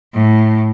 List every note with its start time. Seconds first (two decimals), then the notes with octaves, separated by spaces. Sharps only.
0.14 A2